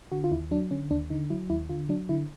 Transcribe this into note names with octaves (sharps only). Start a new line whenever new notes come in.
D3 F#4
F4
D#2 E4
F#3 D4
D3 C#4
D#2 D4
D3 D#4
F#3 E4
D#2 E4
D3 F4
F#3 D4
D3 E4